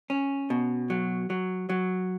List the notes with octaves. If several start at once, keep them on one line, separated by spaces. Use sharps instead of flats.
C#4
B2
F#3
F#3
F#3